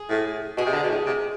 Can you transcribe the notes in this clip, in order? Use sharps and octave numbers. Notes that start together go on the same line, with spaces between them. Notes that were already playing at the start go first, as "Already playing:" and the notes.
Already playing: G#4
A2
B2 G#4
C3
D3
B2
A2
C3